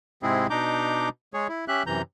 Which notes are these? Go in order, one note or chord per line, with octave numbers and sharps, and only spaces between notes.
G#2 C3 G#3 C4 E4 G#4
B2 D4 D#4 A#5 D6 G6
G#3 G#4 C#5
E4
C#4 G4 E5 F#6
F#2 C3 E3 A#5 G6